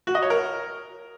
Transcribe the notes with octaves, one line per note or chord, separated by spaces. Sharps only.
F#4
D#5
C#5
A#4